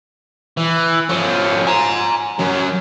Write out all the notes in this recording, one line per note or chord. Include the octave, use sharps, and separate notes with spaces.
E3
F3 C#4
G#5 A#5
F#3 C#4